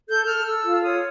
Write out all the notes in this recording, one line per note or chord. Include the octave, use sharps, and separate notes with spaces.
A4 G6
A4 F6
A4 E6
F4
C#5 D#6